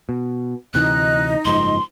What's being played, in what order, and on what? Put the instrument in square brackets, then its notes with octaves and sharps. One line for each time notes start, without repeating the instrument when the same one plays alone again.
[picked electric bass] B2
[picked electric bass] D2 C3 E3 [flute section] D#4 D#5 [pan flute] F#6
[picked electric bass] F#1 G#2 F3 [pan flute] C6